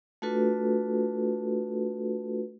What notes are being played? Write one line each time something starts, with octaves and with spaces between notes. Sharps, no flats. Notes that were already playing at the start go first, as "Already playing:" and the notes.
A3 D4 F4 F#4 A4 B4